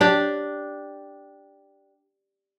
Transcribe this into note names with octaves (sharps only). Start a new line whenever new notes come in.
D4 G4